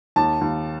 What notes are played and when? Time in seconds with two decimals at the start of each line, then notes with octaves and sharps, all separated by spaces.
0.16 D#2 A5
0.41 D#2